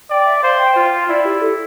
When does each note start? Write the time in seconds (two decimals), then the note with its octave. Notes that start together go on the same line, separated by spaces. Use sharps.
0.10 D5 G5
0.26 E5
0.43 C5 F5
0.59 G5
0.76 F4 G5
0.92 F5
1.08 E4 D5
1.25 G4
1.42 A4